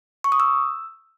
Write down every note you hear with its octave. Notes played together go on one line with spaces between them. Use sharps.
C#6
D#6
E6